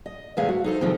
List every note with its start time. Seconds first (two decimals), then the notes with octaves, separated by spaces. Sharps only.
0.06 D#5
0.37 E2 A2 C3 G#3 E5 F5
0.49 F#4
0.64 D#4 A4 C5
0.81 C3 D#3 F3 G#3 C4